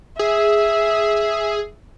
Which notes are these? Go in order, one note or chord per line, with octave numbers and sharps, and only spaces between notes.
G#4 E5